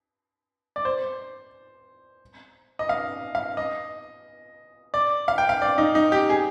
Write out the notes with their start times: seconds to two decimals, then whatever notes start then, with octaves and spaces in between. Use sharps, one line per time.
0.76 D5
0.85 C5
2.79 D#5
2.89 F5
3.35 F5
3.57 D#5
4.94 D5
5.28 F5
5.38 G5
5.49 F5
5.62 D5
5.78 D#4
5.95 D#4
6.12 G4
6.30 G#4